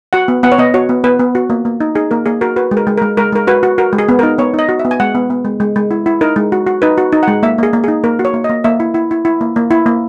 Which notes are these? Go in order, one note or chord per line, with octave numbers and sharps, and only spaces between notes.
F#4 F#5
B3
B3 F#5
C#5
B3 D#5
F#4 C#5
B3
B3 B4
B3
F#4
A#3
A#3
D#4
D#4 G#4
A#3 A#4
A#3 G#4
F#4 A#4
F#4 B4
G#3
A#4
G#3
G#3 A#4
G#3 A#4
G#3 A#4
F#4 B4
F#4
F#4 A#4
G#3
G#4
B3
D#4 A#4
B3 C#5
D#4 D#5
F#4
E5
B3
G#5
G#3 F#5
B3
B3
G#3
G#3
G#3
E4
E4
D#4 A#4
G#3
F#4
F#4
D#4 B4
F#4
D#4
G#3 F#5
A#3 E5
A#3 G#4
A#3
D#4 G#4
A#3 A#4
F#4
C#5
A#3
D#5
A#3
A#3 E5
E4
E4
E4
E4
A#3
A#3
E4
A#3